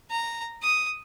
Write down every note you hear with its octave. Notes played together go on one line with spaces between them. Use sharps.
A#5
D#6